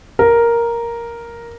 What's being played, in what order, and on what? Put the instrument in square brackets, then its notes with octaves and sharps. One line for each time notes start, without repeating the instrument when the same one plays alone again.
[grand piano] A#4